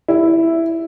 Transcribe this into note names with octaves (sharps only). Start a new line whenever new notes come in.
E4